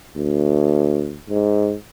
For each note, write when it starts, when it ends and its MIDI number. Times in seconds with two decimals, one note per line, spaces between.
0.16 1.17 38
1.29 1.75 44